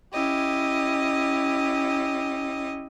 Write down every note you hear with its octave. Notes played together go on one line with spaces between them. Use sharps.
C#4 E4 G4 D#5